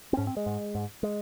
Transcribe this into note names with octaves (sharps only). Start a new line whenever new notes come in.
C4
G#2 C#4
C4
G#3
G#2
G#2
G#3